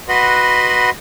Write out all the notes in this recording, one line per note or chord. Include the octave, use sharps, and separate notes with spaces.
F#4 B4 D#5 F#5 B5 C6